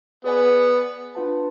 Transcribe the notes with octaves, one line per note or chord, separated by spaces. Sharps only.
B3 G#4 B4 D5 G#5
D4 F4 B4 F#5 A5